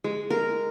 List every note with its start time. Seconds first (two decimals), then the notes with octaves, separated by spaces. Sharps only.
0.04 G#3
0.30 A#4